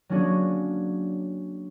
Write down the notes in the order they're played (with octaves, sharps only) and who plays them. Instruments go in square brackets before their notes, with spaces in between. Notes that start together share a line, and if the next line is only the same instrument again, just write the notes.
[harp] F#3 A#3 C#4 D4 F#4 G#4